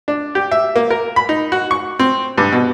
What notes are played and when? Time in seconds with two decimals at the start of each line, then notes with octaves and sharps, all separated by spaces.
0.08 D4
0.35 G4
0.51 E5
0.76 A#3
0.90 A#4
1.16 B5
1.29 D#4
1.52 F#4
1.71 C#6
1.99 C4
2.38 G2
2.52 B2